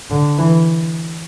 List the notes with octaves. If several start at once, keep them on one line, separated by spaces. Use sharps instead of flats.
D3
E3